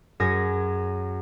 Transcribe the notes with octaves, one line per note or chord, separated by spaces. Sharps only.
F#2 G#4 C#5 G#6 A#6